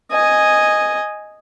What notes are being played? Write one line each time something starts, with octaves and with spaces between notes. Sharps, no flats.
D#5 G#5